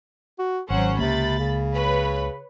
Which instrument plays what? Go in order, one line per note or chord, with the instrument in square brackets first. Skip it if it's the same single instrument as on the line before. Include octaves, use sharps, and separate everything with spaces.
[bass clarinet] F#4
[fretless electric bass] G#1 [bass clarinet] F#3 [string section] C#4 C5 F#5
[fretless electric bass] C#2 A#3 [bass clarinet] C3 [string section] B5 A6
[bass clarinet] C#3
[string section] B4 C#5 B5